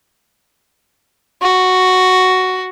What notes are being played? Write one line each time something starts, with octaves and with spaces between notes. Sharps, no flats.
F#4